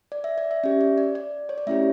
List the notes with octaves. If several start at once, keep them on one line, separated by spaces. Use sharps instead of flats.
D5
E5
D5
E5
C#4 G4 E5
D5
D5
D5
C#5
D5
A3 C#4 E4 G4 E5